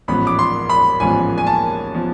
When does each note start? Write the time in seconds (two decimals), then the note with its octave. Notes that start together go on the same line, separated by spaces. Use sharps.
0.08 A1 G#2 F3 B3 B5
0.27 D6
0.39 C6
0.69 B5
1.00 A1 G#2 F3 B3 G#5
1.38 G#5
1.47 A5
1.94 F3 B3